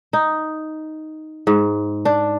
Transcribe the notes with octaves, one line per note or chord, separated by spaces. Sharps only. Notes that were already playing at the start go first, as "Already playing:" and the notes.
D#4
G#2
D4